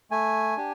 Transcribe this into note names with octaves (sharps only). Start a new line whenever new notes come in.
A3 G#5
D4 G4